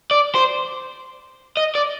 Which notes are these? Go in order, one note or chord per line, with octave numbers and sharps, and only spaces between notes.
D5
C5
D#5
D5